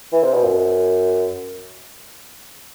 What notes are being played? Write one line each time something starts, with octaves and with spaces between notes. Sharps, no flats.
E3
C3
B2
F#2